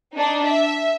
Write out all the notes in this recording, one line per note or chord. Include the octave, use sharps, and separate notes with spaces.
D4 D#4
E5